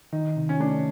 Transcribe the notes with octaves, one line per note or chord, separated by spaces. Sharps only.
D#3 D#4
C3
C#4
A3 D4